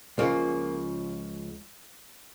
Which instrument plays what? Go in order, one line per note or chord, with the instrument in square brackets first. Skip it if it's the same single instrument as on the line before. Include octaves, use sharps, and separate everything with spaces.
[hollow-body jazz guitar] C#2 C#3 F3 A#3